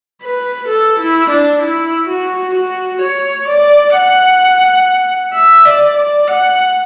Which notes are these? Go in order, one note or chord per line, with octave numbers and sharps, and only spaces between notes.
B4
A4
E4
D4
E4
F#4
F#4
C#5
D5
F#5
E5
D5
D5
F#5